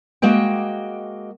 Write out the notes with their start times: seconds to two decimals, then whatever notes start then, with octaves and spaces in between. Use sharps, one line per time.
0.22 G#3 A#3 F#4 D#5 G5